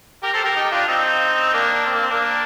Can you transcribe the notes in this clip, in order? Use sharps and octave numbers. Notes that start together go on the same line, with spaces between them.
G4 A#4
A4 C5
G4 A#4
D#4 G4
D4 F4
C4 D#4
A#3 D4
C4
A#3
C4
A#3 D4